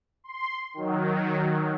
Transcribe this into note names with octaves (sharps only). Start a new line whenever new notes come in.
C6
D#3 F#3